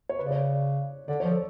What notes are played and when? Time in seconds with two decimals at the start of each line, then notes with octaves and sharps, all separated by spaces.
0.09 C#5
0.19 C#3 B4
0.26 D5
0.31 C#5
0.53 D5
1.08 D3 D5
1.20 F3 C#5
1.32 A4